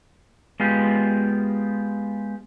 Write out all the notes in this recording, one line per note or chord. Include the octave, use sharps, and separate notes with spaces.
G#3 B3 F4 G4